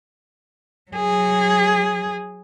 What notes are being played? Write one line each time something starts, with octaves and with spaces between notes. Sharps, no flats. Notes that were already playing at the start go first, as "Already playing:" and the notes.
F#3 G#4